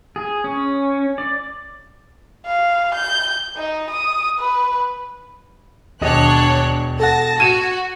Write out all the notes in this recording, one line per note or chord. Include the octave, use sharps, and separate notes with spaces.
G#4
C#4
D5
F5
G6
D#4
D#6
B4
E1 D#2 D4 C#5 D#5 F#6
A4 F#5 A5 A#6
F#4 G#6 D#7 E7